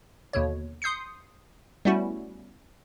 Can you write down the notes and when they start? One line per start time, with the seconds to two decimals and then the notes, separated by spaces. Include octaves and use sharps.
0.33 D#2 B2 D3 C#5
0.82 C6 D#6 G6 C7 C#7
1.85 G3 A3 B3 C#4 E4 F#4